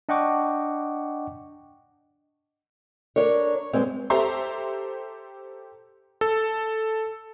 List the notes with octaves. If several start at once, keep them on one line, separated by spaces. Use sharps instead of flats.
D4 D#5 F#5 G5 C#6 D6
D4 A#4 C#5
G2 G#3 C4
G4 A4 C5 E5 A#5 C6
A4